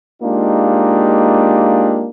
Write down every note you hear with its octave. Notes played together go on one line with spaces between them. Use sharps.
G#3 A#3 D4 D#4 F4 G4